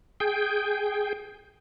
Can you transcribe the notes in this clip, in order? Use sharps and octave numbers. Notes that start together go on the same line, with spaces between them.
G#4 G5